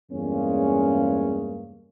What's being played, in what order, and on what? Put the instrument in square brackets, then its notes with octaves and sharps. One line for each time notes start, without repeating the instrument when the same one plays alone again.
[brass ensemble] E2 G2 C#3 G#3 A#3 C#4